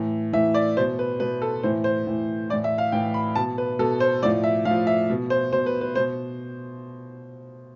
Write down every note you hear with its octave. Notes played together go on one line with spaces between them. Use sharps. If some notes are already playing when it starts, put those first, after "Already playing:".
Already playing: A2 E3
A2 E3 E5
D5
B2 C5
B4
B2 B4
A4
A2 E3 C5
C5
A2 E3
A2 E3 D5
E5
F5
A2 E3 G5
B5
B2 A5
B4
B2 A4
C5
A2 F3 D5
E5
A2 F5
F3
E5
B2
C5
B2 C5
B4
B4
B2 C5